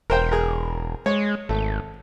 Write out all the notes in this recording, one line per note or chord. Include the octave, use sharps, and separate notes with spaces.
E1 A#4 C5 G5
G#4 A#4
G#3 C#5
G#1 A3